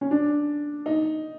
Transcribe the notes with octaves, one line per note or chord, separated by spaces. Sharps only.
C#4
D4
D#4